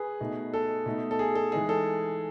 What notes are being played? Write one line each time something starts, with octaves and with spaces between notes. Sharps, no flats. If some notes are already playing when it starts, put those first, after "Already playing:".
Already playing: G#4 B4
B2 A3 D#4
A4
B2 A3 D#4
A4
G#4
A4
E3 G#3 D#4 G#4
A4